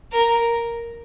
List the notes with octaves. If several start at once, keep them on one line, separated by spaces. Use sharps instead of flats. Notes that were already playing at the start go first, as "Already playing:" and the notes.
A#4